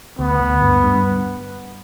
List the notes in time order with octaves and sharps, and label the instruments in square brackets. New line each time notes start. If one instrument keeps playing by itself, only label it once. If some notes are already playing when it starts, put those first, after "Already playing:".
[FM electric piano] D2 [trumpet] B3
[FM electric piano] D2
G2
G2